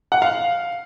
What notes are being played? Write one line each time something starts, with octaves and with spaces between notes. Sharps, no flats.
F#5
F5